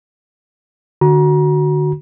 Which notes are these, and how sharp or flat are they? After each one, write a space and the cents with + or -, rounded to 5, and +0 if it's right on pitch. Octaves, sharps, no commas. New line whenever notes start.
D3 +25 F#4 +0 A#5 +35